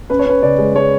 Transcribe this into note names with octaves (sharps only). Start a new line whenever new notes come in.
C#4 B4
C#5
C#4 B4
C#3 D5
G#3
G#3 C#5